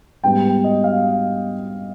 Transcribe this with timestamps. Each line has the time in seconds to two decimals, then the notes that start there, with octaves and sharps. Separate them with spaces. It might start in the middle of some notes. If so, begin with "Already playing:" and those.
0.24 G#2 G3 B3 G5
0.64 D#5
0.84 F5